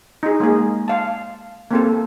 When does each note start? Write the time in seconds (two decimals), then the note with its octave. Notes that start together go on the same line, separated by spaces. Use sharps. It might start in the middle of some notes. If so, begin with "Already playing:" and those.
0.23 D#4 G#4
0.40 G#3 A#3 G#4
0.88 F5 A5
1.71 A#3 C4 A4